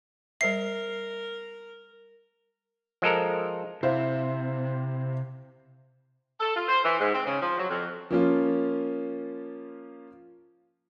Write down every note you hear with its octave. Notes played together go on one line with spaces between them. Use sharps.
G3 A#4 C5 E5 C7
F3 G#3 A4 A#4
C3 E4 C5 F5
A4
F4
C5
E3
G#2
C4
C#3
F3
F#3
F2
F3 A#3 C#4 F4